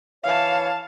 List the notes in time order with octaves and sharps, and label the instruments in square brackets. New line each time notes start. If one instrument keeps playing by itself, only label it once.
[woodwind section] E3 C#5 [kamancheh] F5 A5